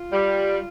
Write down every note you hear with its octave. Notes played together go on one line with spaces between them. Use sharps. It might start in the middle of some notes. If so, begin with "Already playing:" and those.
Already playing: F4
G3